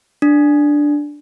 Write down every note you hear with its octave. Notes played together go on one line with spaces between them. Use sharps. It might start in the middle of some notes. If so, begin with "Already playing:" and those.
D4